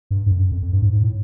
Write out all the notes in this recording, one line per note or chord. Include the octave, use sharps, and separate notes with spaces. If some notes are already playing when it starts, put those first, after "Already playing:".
G2
G2
F#2
F2
F2
G2
G#2
G#2
A2